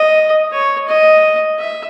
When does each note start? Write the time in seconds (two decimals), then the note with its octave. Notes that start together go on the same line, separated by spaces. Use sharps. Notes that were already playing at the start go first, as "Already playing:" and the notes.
Already playing: D#5
0.52 C#5
0.88 D#5
1.59 E5